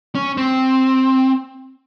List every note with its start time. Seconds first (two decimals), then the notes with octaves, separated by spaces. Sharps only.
0.15 C#4
0.37 C4